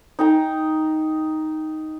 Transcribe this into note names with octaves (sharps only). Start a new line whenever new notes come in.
D#4 G5 A#5